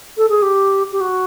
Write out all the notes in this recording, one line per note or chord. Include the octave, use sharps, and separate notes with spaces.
A4
G#4
G4
G4
F#4